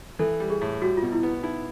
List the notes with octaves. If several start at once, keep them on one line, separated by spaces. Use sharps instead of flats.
E3 A4
G3
G#4
A2
G3 F#4
F4
B2
E4
B3
D#4 E4